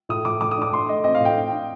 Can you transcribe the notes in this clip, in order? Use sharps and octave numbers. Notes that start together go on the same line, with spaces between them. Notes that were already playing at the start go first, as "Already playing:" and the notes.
A2 D#6
A2 D6
A2 D6
D#6
D4 D6
A2 C6
A3 D#5
C4 D#5
F5
A2 G5
D4
D4